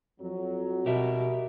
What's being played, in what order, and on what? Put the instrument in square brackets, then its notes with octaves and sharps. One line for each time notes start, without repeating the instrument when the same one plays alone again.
[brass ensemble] F2 F#3
[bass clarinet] B2 [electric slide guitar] G4 A#4 E5